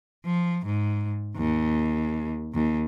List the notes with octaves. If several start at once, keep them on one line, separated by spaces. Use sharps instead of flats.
F3
G#2
D#2
D#2